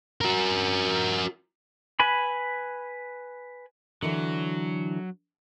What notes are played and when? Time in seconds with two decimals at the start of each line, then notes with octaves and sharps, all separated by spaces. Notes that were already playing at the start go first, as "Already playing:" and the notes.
0.21 F#4 A#4
2.00 B4 G#5 B5
4.02 D3 E3 F#3